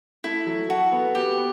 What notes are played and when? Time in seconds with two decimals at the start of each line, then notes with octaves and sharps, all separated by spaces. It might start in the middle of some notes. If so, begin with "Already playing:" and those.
0.24 A3 E4
0.46 F#3
0.69 F#4 A4
0.92 B3
1.15 B3 G4
1.37 B3